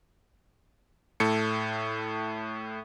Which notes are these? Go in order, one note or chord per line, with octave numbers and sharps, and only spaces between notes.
A2 A4 C#7